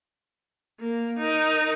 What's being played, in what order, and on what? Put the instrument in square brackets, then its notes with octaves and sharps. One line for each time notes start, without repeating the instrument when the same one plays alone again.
[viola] A#3
D#4 A#4